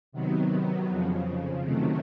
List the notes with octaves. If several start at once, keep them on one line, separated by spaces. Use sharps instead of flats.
C3 D#3 F#3 B3
F2 C#3 F3
C3 D#3 F#3 A3